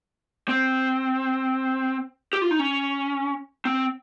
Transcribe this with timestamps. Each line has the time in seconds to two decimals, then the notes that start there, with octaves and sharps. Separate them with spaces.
0.49 C4
2.33 G4
2.42 F4
2.51 D#4
2.59 C#4
3.65 C4